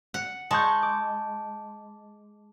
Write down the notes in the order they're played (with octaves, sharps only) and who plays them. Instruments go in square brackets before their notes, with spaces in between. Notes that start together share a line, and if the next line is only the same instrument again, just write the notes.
[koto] F#5
[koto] G#3 [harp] A5 C#6 G6
[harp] D6